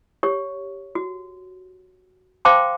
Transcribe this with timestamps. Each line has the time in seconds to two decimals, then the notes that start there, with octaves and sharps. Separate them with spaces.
0.23 G4 C#5
0.95 F#4
2.45 C5 F5 G5 A5 C6 D6